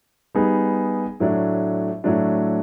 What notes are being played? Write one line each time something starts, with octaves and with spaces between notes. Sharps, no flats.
G3 B3 D#4 G#4
A2 F#3 A3 D4
A2 F#3 A3 D4